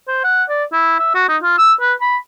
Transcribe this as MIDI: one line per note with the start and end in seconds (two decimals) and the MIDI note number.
0.08 0.22 72
0.24 0.43 78
0.49 0.64 74
0.72 0.97 64
0.99 1.10 76
1.14 1.27 66
1.29 1.37 63
1.42 1.56 65
1.58 1.73 88
1.81 1.93 71
2.01 2.16 83